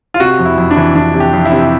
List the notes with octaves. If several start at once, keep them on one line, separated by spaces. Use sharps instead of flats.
F4
C3 F#4
F2
E4
F2
D4
E3
E3 D4
C3
G4
F2
E4
C3